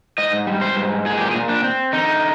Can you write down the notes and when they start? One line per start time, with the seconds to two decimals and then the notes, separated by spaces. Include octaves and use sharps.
0.18 G#2 D#5
0.47 G3
0.61 C5
0.76 G#2
1.06 A#2 G#4
1.18 G4
1.31 G#4
1.34 A#2
1.49 D4
1.64 C4
1.93 D3 D#4